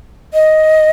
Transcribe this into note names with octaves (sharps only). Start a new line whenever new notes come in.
D#5